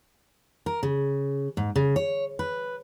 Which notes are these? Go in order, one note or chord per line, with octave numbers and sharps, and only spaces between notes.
A#4
C#3
G#2
C#3
C#5
B4